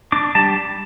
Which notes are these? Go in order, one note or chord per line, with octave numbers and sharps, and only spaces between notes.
D4 D6
G3 A5